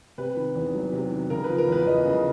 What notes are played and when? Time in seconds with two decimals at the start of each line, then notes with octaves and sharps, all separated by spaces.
0.18 C3 B4
0.37 D#3
0.55 E2
0.74 F#3
0.93 C3
1.11 D#3
1.30 C#3 A#4
1.44 B4
1.49 F3
1.58 A#4
1.68 E2 B4
1.86 E2 D#5
2.05 C#3